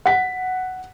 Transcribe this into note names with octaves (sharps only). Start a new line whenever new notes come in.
F#5 B6